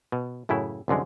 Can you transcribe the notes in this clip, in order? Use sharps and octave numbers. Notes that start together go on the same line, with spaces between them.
B2
F#2 A2 C#3 E4
C2 F#2 D3 G#3